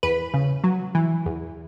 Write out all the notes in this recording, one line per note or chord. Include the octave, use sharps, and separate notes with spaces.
E2 B4
C#3
F#3
E3
E2